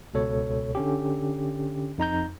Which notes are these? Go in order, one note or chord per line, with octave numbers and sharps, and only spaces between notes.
C#2 B2 A4 C#5
D3 C#4 G4
F2 D#4 A#5 G6